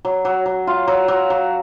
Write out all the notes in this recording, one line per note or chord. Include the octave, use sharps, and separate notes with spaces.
F#3
F#3
F#3
F4
F#3
F#3
F#3